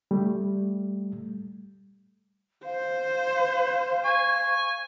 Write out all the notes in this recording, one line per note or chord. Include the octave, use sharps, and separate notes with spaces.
G3 A3
C5 F5
G#5 C#6